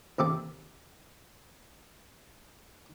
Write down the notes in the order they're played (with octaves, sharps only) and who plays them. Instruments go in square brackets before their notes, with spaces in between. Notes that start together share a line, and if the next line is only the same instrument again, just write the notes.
[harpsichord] D#2 C3 G4 A4